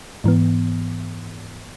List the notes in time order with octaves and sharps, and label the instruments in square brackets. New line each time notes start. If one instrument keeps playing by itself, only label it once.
[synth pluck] G#2 E3 B3